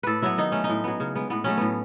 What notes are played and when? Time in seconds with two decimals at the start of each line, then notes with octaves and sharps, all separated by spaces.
0.03 A2 A4 B4
0.22 F#3 B3 E4
0.38 D#3 D#4
0.52 A3 C#4
0.64 D#4
0.69 A2
0.84 F#3 B3
1.00 C#3
1.15 G#3 B3
1.30 A2 B3
1.44 F#3 A3 C#4
1.58 A2 B3